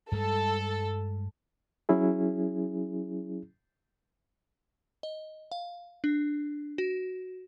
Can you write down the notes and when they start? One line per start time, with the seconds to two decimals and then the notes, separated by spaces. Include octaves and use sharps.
0.12 G2 G3 G#3 A4
1.89 F#3 C#4 E4 G#4
5.03 D#5
5.52 F5
6.04 D4
6.78 F#4